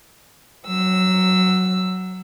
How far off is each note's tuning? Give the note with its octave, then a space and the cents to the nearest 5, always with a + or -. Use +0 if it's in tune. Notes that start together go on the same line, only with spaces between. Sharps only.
F#3 +5 E6 +0